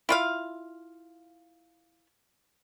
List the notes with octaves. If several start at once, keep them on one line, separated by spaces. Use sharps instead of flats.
E4 F4 F5